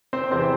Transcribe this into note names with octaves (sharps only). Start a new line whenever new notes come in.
C4 C5
E2 C3 E3 C4 C5